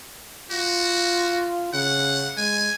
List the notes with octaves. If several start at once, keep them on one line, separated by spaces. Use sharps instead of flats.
F4 F#4
C#3 F#5
G#3 G#5